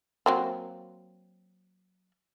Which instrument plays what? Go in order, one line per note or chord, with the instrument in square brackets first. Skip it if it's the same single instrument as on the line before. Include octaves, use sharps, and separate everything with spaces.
[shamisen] F#3 A#3 C4